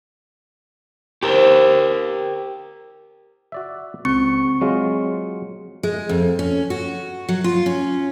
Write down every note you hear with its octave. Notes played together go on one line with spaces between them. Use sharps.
C4 G4 A#4
F#4 D5 E5
C#2 C4 C#6 C#7
F#3 G#3 F4
G#3
F2
C#4
F#4
F#3
F4
C#4